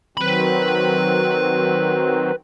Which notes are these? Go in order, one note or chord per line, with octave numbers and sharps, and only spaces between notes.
D#3 F#3 C4 B4 B5